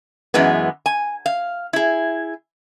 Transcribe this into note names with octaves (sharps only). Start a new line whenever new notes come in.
F#2 E3 G#3 B3
G#5
F5
E4 G#4